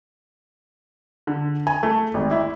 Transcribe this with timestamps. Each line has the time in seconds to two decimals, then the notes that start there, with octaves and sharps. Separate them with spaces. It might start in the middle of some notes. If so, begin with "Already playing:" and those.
1.27 D3
1.67 G#5
1.83 A3
2.14 G#1
2.31 E4